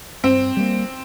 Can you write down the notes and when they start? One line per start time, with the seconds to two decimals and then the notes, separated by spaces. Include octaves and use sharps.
0.24 G2 C4
0.57 G3 A#3